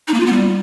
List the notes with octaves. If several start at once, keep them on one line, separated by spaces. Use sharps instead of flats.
D#4
A#3
F4
B3
G3